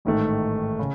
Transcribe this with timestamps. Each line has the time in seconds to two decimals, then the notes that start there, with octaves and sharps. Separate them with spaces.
0.05 A1 G#2 D#3 A3
0.79 C#3